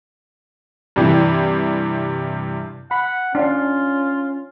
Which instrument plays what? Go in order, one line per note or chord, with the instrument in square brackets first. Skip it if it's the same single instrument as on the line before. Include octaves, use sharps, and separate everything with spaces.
[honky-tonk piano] G2 C3 E3
[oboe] F#5 [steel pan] B5
[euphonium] C#4 [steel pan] D4 F5 [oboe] F4